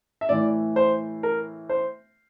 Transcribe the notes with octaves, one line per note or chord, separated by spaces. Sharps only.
E5
A2 E3 D5
C5
A#4
C5